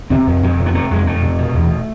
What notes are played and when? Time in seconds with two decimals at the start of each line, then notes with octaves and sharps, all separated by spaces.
0.10 C3 C4
0.27 F2
0.43 F2
0.59 C3
0.66 B3
0.74 C3 A3
0.90 F2 G#3
1.07 F2 A3
1.23 C3
1.38 B2
1.54 E2